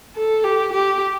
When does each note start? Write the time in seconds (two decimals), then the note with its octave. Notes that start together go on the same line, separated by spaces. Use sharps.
0.16 A4
0.44 G4
0.72 G4